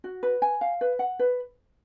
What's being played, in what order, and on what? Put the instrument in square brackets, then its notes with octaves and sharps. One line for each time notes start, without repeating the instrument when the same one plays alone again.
[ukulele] F#4
B4
G#5
F5
B4
F#5
B4